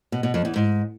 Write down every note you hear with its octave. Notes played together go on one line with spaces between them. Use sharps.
B2
B2
F2
E2
G#2